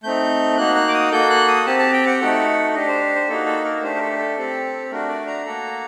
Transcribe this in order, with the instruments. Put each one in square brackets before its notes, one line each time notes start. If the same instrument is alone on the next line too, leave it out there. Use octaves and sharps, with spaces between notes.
[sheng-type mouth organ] A3 C4 D#4 G6
A#3 D#4 F#4 F#6
F#6
D6
D#6
A#3 F#4 A4 G6
F#6
D#6
C4 G4 A5
A5
G5
F#5
A3 D#4 F#4 A4
D4 G4 D#5
C5
C5
A#3 D#4 F#4 A4
A4
A#4
A3 D4 G4 C5
A#4
A4
A4
C4 G4
A3 D4 F#4 A#4
D5
A#5
A#3 F#4 A4